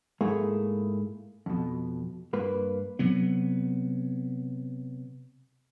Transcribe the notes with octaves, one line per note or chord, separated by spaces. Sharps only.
G#2 A3 A#3 E4 G#4
F2 B2
G2 A#3 B4
C3 F#3 B3